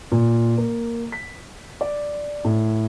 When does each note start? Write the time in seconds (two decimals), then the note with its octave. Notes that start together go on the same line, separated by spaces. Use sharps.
0.12 A#2
0.58 A#3
1.12 B6
1.81 D5
2.45 A2